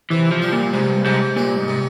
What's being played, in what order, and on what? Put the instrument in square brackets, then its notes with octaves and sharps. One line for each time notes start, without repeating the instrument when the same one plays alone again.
[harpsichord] C3 [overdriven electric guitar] E3
[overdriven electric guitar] F3
[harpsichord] G3
[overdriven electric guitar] A#2
[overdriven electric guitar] G#2 [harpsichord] C3
[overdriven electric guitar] G2
[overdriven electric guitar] G#2 [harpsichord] C3
[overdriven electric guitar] A#2 [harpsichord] G3
[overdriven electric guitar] G#2
[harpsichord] C3